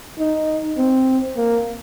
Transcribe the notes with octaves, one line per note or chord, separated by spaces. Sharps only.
D#4
C4
A#3